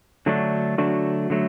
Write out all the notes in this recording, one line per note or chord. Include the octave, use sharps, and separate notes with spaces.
D3 F#3 A3 D4 F#4
D3 F#3 A3 D4 F#4
D3 F#3 A3